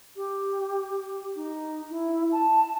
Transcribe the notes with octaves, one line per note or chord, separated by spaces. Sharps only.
G4
D#4
E4
A5